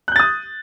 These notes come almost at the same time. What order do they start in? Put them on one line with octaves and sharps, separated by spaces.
F#6 G6 A6 D#6